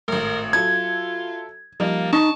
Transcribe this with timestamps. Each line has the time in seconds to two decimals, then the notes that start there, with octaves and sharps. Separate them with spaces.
0.08 G#1 A2 A#4
0.53 F#3 E4 F4 A4 G#6
1.80 F3 G3 A#3 D#4
2.13 D#4 A5 C#6 E7